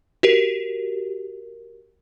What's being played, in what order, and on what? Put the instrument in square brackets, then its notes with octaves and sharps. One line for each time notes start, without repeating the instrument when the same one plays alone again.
[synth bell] F#4 G4 A#4